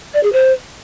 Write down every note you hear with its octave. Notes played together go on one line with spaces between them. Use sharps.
D5
G#4
C5